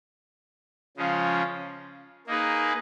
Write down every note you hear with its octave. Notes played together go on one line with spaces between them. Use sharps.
C#3 F3 G#3 C#4 F4
A#3 D#4 G#4 B4